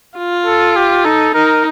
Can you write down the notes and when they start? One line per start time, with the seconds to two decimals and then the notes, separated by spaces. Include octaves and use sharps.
0.17 F4
0.46 A4
0.76 G4
1.05 D#4 A4
1.34 D#4 A#4